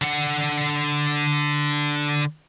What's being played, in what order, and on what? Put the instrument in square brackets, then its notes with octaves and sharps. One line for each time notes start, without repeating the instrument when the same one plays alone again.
[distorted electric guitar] D3 F#5